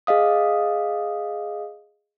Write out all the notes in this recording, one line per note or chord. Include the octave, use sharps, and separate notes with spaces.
G#4 D#5 F5 D#6